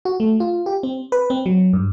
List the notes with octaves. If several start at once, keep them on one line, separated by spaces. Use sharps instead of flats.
F#4
A3
F4
G4
C4
B4
C4
F#3
G2